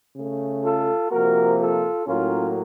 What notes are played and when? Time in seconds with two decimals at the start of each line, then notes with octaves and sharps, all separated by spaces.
0.15 C#3 A3
0.63 F4 A4
1.10 C3 F3 A#3 F#4 A#4
1.59 F4 A4
2.06 A2 F#3 A#3 C#4 F4